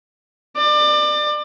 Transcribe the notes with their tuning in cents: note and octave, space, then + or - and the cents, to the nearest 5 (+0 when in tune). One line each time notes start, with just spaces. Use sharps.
D5 +30